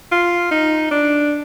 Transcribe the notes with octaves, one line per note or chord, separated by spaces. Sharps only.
F4
D#4
D4